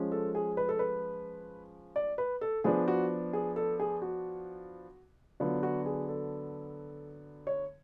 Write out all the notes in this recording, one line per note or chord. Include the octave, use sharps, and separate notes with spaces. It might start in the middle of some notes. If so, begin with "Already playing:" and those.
Already playing: F3 G#3 C#4
A4
G#4
B4
A4
B4
D5
B4
A4
F3 B3 D4 G#4
F#4
G#4
A4
G#4
F#4
D3 F#3 B3 F4
F#4
G#4
A4
C#5